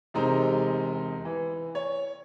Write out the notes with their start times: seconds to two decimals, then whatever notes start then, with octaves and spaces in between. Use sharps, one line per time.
0.14 E1 C3 G#3 D#4 C5 A#5
1.25 E3
1.75 C#5